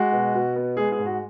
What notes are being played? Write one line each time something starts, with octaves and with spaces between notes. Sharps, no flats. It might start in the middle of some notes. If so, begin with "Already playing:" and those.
Already playing: G#3 F#4
B2
B2
B3
G#3 G#4
G#4
G#2
F#4